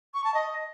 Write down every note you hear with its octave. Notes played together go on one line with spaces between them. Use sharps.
C#6
A5
D#5